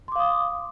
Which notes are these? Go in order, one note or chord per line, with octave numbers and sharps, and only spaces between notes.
F5 C6 D6 D#6